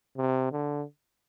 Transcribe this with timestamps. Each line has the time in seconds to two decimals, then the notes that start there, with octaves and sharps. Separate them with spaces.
0.17 C3
0.52 D3